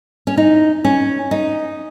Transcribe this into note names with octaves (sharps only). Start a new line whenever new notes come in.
C#4
D#4
C#4
D#4